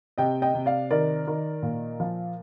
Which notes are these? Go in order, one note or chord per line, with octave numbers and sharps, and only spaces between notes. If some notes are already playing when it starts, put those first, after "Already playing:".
C3 D#5 G5
D#5 G5
C3
D5 F5
D#3 A#4 D5
D#3
A#2
F3